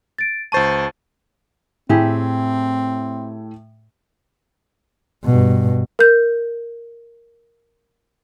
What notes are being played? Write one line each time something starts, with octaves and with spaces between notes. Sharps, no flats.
A6 D7
C#2 C5 A5 C#6 A6 D#7
A2 A3 C4 E4 G4 G#4 G5
G2 B2
A#4 G6